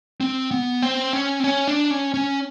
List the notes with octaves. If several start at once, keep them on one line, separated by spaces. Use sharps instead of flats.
C4
B3
C4
C#4
C4
C#4
D4
C#4
C#4